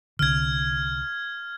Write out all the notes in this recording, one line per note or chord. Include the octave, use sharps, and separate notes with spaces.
C2 D3 F6 G#6